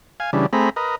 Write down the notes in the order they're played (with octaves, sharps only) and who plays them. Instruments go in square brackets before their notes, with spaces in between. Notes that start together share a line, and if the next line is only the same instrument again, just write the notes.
[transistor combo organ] F5 G#5
C#3 E3 G3 D4
A3 C4 G#4 A#5 B5
A#4 B4 D#5